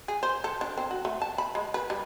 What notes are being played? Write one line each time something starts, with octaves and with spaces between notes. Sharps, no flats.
G#4
C5
A4
D4
C4
F#4
A3
A5
B5
G#3
B4
G3